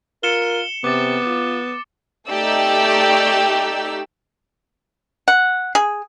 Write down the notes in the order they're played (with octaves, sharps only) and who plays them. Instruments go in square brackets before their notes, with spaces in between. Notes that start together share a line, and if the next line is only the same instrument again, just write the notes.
[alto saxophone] F4 [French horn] A#4 [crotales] C#7 E7 G7
[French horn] C3 [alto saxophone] B3 [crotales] D6 A6
[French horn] F4
[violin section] A3 D#4 G4 D5 E6
[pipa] F#5
G#4